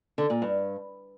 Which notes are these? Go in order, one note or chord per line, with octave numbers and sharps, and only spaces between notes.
D3
A#2
G2